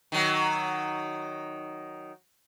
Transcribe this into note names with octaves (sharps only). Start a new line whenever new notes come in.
D#3 F#3